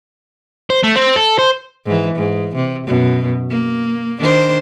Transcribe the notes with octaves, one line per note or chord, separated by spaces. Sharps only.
C5
A3
C4
A4
C5
G#2 E3
G#2
C3
F#2 B2
A#3
D#3 D4 C5